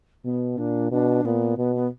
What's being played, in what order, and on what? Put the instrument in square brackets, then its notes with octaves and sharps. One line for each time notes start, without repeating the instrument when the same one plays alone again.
[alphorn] B2 [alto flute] B3
[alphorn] A#2 [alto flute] D4
[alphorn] B2 [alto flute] D4
[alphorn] A#2 [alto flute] B3
[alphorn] B2 [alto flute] B3
[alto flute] B3